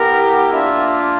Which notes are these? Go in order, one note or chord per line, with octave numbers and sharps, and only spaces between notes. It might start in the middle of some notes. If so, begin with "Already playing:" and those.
Already playing: B3 E4 G4 A#4
A#3 D4 F4 E5